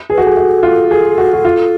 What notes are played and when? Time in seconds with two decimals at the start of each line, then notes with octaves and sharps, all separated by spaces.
0.10 G#4 B4
0.18 F#4
0.22 G#4 A4
0.37 F#4
0.63 F4
0.91 G#4
1.18 F#4
1.33 F#4
1.45 F4